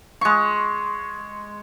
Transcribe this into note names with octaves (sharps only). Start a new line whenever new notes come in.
G#3 C#6